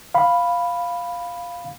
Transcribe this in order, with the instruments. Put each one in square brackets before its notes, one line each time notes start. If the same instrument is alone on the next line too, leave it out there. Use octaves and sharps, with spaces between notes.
[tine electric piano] F5 B5